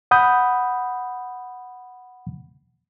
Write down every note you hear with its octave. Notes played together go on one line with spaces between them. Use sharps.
F#5 B5 D#6 G6